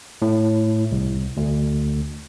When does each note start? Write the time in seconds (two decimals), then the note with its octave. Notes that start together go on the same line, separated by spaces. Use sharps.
0.22 A2
0.92 C2
1.37 D2